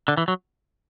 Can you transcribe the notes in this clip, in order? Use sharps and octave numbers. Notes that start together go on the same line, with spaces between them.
D3
E3
F#3